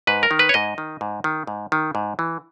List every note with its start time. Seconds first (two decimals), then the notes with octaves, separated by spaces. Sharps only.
0.07 G#2 B4
0.23 A#4
0.31 D#3
0.39 B4
0.49 C#5
0.54 G#2 D#5
0.78 D#3
1.01 G#2
1.24 D#3
1.47 G#2
1.72 D#3
1.95 G#2
2.19 E3